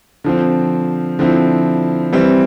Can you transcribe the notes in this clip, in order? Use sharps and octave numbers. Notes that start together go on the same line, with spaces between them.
D3 F3 C4
D3 F3 C4 E4
E3 G3 C4